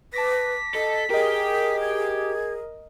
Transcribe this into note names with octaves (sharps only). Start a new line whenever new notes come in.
B4 A5 D6 A#6 B6
A4 D#5
G4 G#4 A#4 D#5
G#6